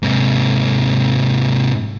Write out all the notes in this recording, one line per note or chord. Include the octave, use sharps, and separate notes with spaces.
G#2 C3